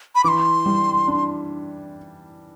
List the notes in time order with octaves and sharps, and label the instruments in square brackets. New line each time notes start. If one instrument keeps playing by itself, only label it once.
[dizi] B5
[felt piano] E3 [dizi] D6
[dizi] C6
[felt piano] G3
D4